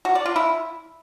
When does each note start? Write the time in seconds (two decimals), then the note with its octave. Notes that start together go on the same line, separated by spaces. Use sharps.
0.05 F#4
0.15 D5
0.25 F4
0.36 E4